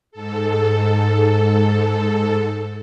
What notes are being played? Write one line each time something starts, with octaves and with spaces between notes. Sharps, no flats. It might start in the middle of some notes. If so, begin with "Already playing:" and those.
G#2 A4